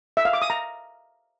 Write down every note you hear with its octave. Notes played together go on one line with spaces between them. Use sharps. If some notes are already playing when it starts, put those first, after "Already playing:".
E5
F5
D6
D#6
A#5